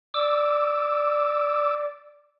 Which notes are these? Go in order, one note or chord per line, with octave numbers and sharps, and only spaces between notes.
D5 D6 E6